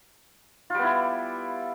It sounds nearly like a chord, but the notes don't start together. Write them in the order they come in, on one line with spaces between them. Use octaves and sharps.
F4 G3 B3 E4